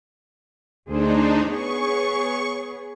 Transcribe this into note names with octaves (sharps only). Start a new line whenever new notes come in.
D2 D4 D#4 G#4 C5
B3 G#4 C#5 C#6